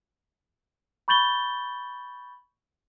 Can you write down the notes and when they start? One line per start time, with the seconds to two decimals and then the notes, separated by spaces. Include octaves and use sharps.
1.08 B5 C#6 G6 A6 F#7 G7